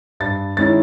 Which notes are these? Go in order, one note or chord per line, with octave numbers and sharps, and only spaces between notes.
G2 A6
D#3 G#3 C#4 E4 A6